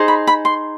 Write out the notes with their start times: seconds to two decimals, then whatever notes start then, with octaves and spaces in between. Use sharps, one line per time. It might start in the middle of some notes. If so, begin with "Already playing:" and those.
Already playing: D#4 G#4 C5
0.08 B5
0.27 B5
0.45 C6